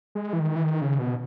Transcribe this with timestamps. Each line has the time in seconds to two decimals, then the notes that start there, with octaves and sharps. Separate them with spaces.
0.15 G#3
0.33 E3
0.40 D#3
0.56 E3
0.64 D#3
0.81 C#3
0.99 B2